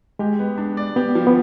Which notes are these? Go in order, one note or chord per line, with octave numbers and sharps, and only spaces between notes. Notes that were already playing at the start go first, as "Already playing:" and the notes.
G#3 G4
B3
D4
D5
B3 G4
F3
B3